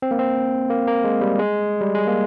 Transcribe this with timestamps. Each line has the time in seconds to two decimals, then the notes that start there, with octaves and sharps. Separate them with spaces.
0.02 C4
0.11 A#3
0.19 C4
0.70 A#3
0.87 A#3
1.04 G#3
1.21 G3
1.39 G#3
1.81 G3
1.95 G#3
2.07 A#3